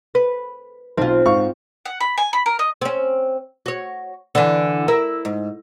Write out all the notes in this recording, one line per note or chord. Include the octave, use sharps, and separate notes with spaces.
B4
B1 C4 F4
G#2 F5 C#6
F#5
B5
G#5
B5
A#4
D#5
C4 C#4
F#4 C#5
D3 E3
E4 A#4 E5
G#2